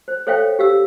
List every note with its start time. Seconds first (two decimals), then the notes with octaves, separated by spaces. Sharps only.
0.08 C5
0.27 A4 C5 C#5 E5 F5 G5
0.59 G4 F5 E6